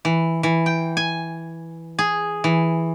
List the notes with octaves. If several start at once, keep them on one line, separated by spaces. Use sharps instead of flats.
E3
E3
G5
G#5
G#4
E3